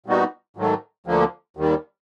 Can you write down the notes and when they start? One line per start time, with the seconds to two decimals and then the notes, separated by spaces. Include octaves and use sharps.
0.06 A#2 G3 B3 D#4 F#4
0.57 G#2 D#3 F#3 A3
1.07 D2 D3 F3 A#3
1.57 D#2 D#3 G3